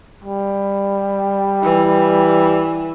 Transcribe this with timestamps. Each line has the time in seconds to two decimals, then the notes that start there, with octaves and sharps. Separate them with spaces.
0.24 G3
1.63 E3